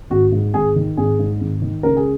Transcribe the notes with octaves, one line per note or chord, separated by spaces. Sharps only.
G#1 F#4
G#2
G#1 G#4
D#3
G#1 G#4
G#2
G#1
D#3
C#2 A#4
G#4